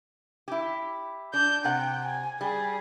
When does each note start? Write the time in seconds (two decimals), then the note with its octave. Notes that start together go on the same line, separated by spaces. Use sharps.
0.48 E4 G4
1.34 D4 G6
1.65 C3 F#5 G5
2.05 G#5
2.41 G3 G#4